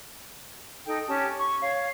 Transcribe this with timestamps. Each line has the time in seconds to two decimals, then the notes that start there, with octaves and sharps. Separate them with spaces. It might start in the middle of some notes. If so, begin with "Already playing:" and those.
0.85 D#4 A4 G5
1.06 C#4 G4 A5
1.38 C#6
1.60 C#5 F5